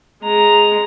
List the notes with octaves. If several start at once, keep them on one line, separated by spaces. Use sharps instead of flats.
G#3 A#5